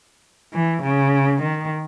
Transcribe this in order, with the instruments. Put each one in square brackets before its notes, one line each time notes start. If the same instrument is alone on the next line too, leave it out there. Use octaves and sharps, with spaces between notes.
[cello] E3
C#3
D#3